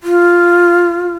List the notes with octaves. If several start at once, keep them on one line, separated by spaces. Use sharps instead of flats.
F4